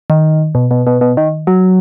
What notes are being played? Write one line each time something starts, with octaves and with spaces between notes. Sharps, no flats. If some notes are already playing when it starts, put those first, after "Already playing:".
D#3
B2
B2
B2
B2
D#3
F#3